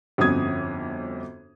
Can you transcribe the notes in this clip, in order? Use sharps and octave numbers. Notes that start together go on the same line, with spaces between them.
G1 F2 C#4 F#4 D#6 G#6